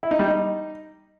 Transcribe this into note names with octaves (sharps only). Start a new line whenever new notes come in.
E4
D#4
G3
D#4